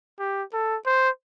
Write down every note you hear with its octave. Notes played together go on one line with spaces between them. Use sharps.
G4
A4
C5